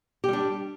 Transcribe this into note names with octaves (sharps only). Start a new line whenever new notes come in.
G3 D4 G4